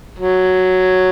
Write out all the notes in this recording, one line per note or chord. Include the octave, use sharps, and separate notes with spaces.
F#3